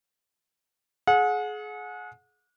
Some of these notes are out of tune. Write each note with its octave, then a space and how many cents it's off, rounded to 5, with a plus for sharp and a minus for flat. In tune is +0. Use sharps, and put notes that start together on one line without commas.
G#4 +30 F#5 -30